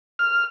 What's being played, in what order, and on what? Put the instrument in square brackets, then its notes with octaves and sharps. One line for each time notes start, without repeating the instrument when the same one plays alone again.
[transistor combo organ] F6